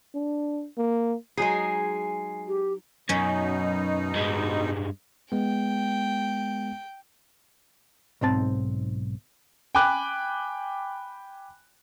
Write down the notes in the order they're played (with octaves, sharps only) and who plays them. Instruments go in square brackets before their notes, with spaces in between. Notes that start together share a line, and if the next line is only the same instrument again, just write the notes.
[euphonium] D4
A#3
[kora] F#3 D#4 [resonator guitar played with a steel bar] G#3 G#4 [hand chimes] G#5 C7
[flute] G4
[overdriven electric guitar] F#2 [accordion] B2 D#4 [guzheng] C#4
[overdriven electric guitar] G2 G#3
[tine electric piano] G#3 B3 [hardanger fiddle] G5
[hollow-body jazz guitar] B1 G#2 C4 A5
[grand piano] G5 G#5 B5 D6 F#6